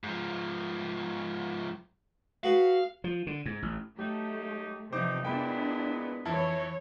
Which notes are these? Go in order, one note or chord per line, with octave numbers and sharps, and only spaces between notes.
G#2 F3
F#4 G#4 B4 F5
F3
D3
G#2
A1
F#3 A3 D#4 G4
E2 C3 E3 F3 D#4 C5 D6
A#2 G#3 B3 D4 E4 G5 B5
F2 E3 E4 C#5 A5